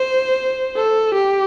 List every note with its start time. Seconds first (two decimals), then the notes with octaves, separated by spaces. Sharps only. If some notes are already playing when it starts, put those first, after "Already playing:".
Already playing: C5
0.76 A4
1.15 G4